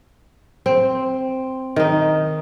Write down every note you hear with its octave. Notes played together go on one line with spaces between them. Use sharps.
C4
D#3 D#4